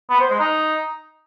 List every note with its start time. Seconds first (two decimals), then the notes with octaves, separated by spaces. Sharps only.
0.10 B3
0.20 C5
0.30 G#3
0.40 D#4